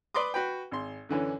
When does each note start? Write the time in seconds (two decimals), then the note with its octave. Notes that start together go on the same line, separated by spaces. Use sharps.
0.14 B4 D5 C6 D6 D#6
0.34 F#4 B4 G5
0.71 G#1 C6
1.09 F#2 D3 E3 C#4